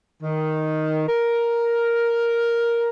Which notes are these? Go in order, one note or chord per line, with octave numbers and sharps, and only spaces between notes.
D#3
A#4